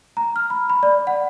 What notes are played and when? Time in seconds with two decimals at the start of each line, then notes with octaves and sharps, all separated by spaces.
0.17 A#5
0.36 F6
0.50 B5
0.70 B5
0.83 D5
1.07 F#5